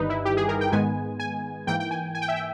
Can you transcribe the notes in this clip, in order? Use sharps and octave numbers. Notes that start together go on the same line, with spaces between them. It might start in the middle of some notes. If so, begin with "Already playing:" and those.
Already playing: G1 G2 D#3 G3 D#4 B4
E4
G4
G#4
A#4
G5
G#2 D#3 G#3 B3 G#5
G#5
G#2 E3 A#3 G5
G5
G#5
G#5
G5
E5
G5